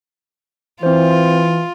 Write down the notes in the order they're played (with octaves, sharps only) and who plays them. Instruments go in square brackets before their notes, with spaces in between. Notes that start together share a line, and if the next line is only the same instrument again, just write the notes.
[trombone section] E3 [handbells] C4 C5 [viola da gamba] F4